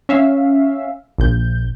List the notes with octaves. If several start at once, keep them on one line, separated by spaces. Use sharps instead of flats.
C#4 E5 F5
A#1 G6